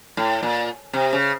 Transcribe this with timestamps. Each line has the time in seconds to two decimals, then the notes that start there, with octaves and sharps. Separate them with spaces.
0.17 A2
0.43 A#2
0.93 C3
1.13 C#3